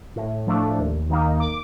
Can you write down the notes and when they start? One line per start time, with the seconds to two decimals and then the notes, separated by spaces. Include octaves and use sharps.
0.16 A2
0.47 F3 A3 D4
0.79 D#2
1.10 D#3 A#3 D#4
1.40 D6